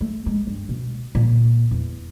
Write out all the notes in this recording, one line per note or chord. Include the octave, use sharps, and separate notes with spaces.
A3
G#3
G2
B2
A#2
E2